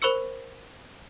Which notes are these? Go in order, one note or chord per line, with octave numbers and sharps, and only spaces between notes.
A#4 C5 B5 C#6 E6 C#7